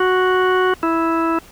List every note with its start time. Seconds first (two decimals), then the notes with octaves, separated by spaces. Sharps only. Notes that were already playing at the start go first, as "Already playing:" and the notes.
Already playing: F#4
0.83 E4